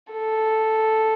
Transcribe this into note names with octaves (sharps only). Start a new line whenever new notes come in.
A4